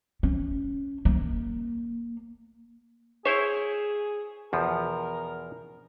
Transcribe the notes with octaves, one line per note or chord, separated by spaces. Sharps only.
C#4
A#3
E4 G#4 C5 C#5 E5
E2 B2 F3 A#4